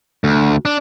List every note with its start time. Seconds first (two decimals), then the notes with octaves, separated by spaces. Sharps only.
0.24 D2
0.65 D4